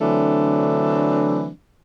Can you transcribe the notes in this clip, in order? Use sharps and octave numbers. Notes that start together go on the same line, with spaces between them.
D3 E3 F#3 A3 C4 D4